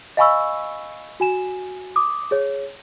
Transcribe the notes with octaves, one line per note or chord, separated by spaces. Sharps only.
D#5 F5 G#5 B5 C#6 E6
F#4 G#5 E7
D6 D#6
G#4 C#5